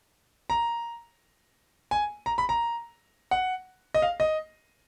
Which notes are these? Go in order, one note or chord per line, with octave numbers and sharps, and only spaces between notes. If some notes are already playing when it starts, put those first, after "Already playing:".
A#5
G#5
A#5
B5
A#5
F#5
D#5
F5
D#5